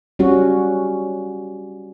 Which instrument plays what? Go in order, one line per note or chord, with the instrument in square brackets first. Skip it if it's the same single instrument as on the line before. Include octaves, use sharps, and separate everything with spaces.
[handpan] G3 C#4 F#4